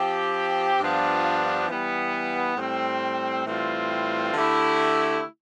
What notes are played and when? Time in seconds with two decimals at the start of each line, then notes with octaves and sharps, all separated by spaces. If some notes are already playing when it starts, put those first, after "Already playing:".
Already playing: F3 C4 G4
0.80 G2 F3 B3 D4 F4
1.68 E3 G3 B3
2.57 A2 G3 C4
3.46 A2 E3 G3 C4 F4
4.34 D3 A3 E4 G4